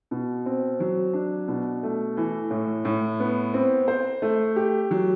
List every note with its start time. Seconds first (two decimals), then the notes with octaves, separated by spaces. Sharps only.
0.11 B2
0.46 C4
0.80 F#3
1.13 D4
1.48 B2
1.83 A3
2.17 E3
2.51 A2
2.85 A2
3.20 B3
3.54 C4
3.88 C5
4.22 A3
4.56 G4
4.91 F#3